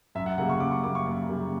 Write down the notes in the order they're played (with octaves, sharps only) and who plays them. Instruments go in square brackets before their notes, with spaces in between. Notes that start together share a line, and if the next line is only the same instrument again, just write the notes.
[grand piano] F#2 E5
F#5
C#3 G3 A#3 F#5
C#6
F#2 D6
C#6
C#3 G3 A#3 D6
C#6
F#2
C#3 G3 A#3